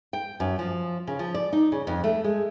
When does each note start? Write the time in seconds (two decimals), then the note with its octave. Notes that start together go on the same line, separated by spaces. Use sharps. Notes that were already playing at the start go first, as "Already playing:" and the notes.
0.13 G5
0.40 F#2
0.59 F3
1.07 C#3
1.19 F3
1.34 D5
1.53 D#4
1.72 C#3
1.87 F2
2.04 A3
2.24 G#3